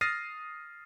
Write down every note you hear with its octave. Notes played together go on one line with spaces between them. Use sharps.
D#6 F6 A6 A#6 C7 D#7